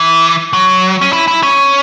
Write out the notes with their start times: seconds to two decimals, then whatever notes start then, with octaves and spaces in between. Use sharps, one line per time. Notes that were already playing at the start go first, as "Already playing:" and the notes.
Already playing: E3
0.53 F#3
1.01 C#4
1.13 E4
1.28 E4
1.43 C#4